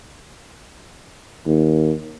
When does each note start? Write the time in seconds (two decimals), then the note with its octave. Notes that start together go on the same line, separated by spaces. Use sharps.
1.47 D#2